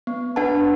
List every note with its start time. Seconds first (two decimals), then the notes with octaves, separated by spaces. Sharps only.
0.07 B3
0.36 D4 B4 F#5 A5